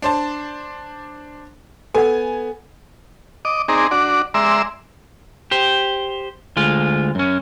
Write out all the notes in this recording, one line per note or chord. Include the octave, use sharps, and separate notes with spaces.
D4 C5 A5
B3 A4 F#5 G#5
D#5 D6
C4 D#4 G#4 D5 A#5
D4 F#4 D5
G#3 D5 E5 A#5 C6 E6
G4 C5
D2 G#3 F4
F#2 C#4